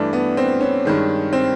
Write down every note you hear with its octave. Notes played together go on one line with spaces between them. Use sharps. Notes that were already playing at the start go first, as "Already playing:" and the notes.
Already playing: G2 E3 A3 D4
B3
C4
C#4
G2 D#3 G#3
C4